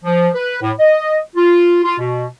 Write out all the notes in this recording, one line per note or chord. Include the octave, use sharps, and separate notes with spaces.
F3
B4
A2
D#5
F4
F4
B2